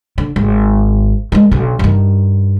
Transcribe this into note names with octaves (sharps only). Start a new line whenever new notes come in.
D3
G#1
D#3 G#3
B1 D3
G2 D#3